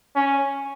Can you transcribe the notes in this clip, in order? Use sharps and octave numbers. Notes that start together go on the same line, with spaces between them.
C#4